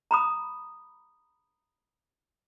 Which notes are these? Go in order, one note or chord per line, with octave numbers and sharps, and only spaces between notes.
A#5 B5 D#6